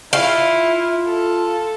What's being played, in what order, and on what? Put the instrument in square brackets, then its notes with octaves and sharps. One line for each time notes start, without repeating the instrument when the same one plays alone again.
[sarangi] E4 [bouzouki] F4
[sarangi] A4